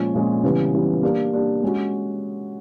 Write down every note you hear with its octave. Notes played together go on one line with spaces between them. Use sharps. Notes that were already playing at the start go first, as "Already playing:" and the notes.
Already playing: A#2 F3 G#3 C#4
A#2 F3 G#3 C#4
C#3 E3 G3 B3
C#3 E3 G3 B3
A#3 D4 G4
A#3 D4 G4
G#3 C#4 F#4